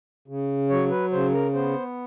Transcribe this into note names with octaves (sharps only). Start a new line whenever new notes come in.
C#3
F#3 C#5
B4
C#3 C5
A#4
B3 C5